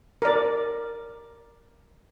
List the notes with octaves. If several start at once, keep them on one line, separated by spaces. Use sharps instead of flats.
A#4 D5